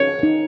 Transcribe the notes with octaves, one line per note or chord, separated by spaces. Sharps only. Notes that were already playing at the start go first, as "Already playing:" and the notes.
Already playing: C#5
D#4